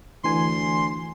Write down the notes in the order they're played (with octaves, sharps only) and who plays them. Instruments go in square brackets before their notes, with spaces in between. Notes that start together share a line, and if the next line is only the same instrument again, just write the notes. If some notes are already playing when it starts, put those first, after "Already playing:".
[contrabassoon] D2 [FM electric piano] E3 G#5 [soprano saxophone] C6